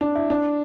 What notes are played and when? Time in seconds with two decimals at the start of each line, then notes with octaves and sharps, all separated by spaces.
0.01 D4
0.15 E4
0.30 D4